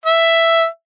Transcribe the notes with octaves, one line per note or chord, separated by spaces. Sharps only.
E5